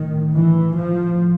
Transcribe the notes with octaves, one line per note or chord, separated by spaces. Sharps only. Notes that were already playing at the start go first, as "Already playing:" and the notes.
Already playing: A2 D#3
E3
A2 F3